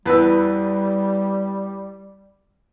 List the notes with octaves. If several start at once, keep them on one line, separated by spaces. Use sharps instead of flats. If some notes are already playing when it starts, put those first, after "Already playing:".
E2 G3 B4 E6